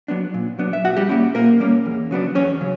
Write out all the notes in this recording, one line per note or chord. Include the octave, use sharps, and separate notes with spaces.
F#3 B3 D4
A#2
F#3 B3 D4
E5
A#2 F#4 F#5
G3 G4
G3 A#3 C#4 E4
A#2 A#3 A#4
G3 A#3 C#4
E2
C#3 F#3 B3 D4
E2 C#4 C#5
C#3 F#3